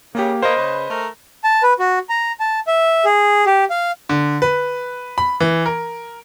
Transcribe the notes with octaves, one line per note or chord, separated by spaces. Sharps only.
C#3 A#3 G4
A#3 B4 C5 D#5
C#3 B4
A3 A#4
A5
B4
F#4
A#5
A5
E5
G#4
G4
F5
D3
B4
B5
E3
A#4